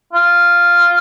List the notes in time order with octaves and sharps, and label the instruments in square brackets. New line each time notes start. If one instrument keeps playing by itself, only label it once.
[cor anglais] F4